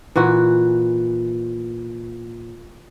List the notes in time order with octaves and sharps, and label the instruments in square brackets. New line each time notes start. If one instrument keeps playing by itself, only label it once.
[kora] A#2 E3 F#4